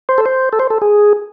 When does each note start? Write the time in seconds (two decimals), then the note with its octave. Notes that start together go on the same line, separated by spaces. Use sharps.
0.09 C5
0.18 A4
0.26 C5
0.53 A4
0.59 C5
0.70 A4
0.82 G#4